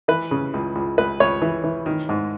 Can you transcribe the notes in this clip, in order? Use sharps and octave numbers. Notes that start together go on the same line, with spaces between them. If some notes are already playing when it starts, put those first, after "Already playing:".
E3 B4
C#3
C#2
C#2
C#2 B4
C#2 C#5
E3
E3
D#3
G#2